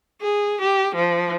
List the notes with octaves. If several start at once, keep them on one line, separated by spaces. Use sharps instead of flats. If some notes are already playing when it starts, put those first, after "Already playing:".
G#4
G4
F3